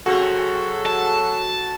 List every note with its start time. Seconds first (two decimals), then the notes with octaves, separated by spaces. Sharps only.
0.06 C#3 F#3 C4 F#4 G#4 A4
0.86 A5